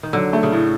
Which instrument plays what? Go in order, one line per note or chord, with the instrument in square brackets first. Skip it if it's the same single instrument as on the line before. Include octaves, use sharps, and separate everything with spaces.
[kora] D#3
[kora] D3 [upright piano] F#3
[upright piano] A3
[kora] C#3
[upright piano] A2